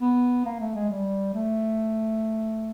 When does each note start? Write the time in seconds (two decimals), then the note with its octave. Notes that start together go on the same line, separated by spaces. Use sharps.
0.01 B3
0.46 A#3
0.60 A3
0.75 G#3
0.90 G3
1.34 A3